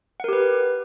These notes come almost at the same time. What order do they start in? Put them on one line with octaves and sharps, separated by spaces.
F#5 A#4 G4 B4